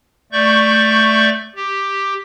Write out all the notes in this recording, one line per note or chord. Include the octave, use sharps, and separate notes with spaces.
A3 D5 C#6 G6
G4